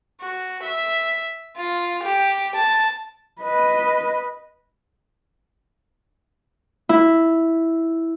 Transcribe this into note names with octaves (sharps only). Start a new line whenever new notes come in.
F#4
E5
F4
G4
A5
B4 D#5
E4